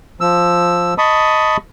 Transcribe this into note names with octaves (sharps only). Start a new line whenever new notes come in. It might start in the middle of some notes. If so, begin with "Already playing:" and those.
F3 E6
D#5 A5 B5 C#6 D#6